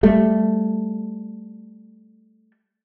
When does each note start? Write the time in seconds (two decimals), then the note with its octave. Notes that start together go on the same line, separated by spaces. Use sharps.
0.03 G3 A3